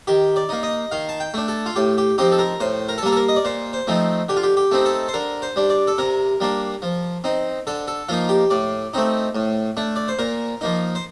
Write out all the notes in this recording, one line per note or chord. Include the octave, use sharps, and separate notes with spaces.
D#3 G4
D5
A#3 D#4
D#5
D#3 F5
A5
G5
A3 D4
A4
F4
A2 G4
G4
F3 C4 D#4 G4
A4
A#4
A2 C5
A#4
A4
G3 A#3 A#4
A4
A#4
D#5
D5
A#2 C5
C5
F3 A3 C4 D#4
D3 G4
F4
G4
G4
A3 C4 D#4
A4
C5
D3 A#4
C5
G3 D4
D5
A4
C3 A#4
G3 A#3 D4
F3
C4 D#4
D3 A4
A4
F3 A#3 D#4 F4
G4
A2 D5
A3 C4 D#4
A2
A3 D4
D5
C5
A#2 A#4
F3 A#3 D#4
C5